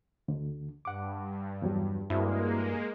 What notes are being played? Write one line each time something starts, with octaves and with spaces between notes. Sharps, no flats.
D2 D3
G2 F#5 D6
E2 F#3 G3
G2 G#3 A#3 C4 E4 F#4